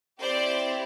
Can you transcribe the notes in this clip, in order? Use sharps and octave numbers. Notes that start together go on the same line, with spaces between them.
C4 E4 G4 C5 D5